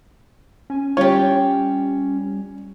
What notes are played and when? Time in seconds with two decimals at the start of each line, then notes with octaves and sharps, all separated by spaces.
0.70 C#4 G#5
0.97 G3 F4 G4 C#5